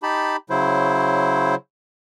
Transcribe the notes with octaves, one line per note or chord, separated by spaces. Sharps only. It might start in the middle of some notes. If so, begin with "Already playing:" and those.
D#4 G4 A5 B5
C#3 F#3 E4 C5